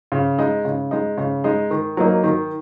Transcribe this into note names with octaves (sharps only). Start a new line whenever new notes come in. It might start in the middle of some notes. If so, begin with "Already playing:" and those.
C#3
G#3 D#4
C#3
G#3 D#4
C#3
G#3 D#4
D#3
F#3 A#3 D#4
D#3